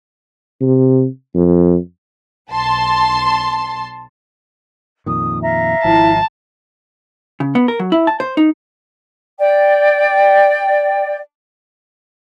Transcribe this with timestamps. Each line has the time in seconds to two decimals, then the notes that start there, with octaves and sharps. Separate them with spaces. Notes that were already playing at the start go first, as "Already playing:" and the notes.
0.61 C3
1.35 F2
2.51 B1 A5 C6
5.06 F2 A#2 D#3 D#6
5.42 E5 F5 A#5
5.84 G#1 F3 E4 A5
7.40 C#3
7.55 B3
7.68 A#4
7.80 F#3
7.92 E4
8.07 A5
8.20 C5
8.37 D#4
9.40 D5 G5